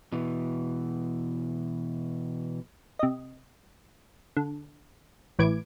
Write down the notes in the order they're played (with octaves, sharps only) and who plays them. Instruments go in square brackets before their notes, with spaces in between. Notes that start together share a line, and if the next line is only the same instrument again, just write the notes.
[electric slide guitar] B2 E3
[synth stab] C3 D#5
D3
A1 A2 E3 D6 G#6 D7